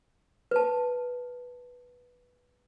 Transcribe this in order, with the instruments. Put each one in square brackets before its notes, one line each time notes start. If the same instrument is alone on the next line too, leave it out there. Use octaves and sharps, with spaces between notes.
[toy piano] B4 A5